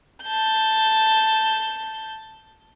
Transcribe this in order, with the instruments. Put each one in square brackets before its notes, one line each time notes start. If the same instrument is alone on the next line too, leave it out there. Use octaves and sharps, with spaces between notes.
[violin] A5 G6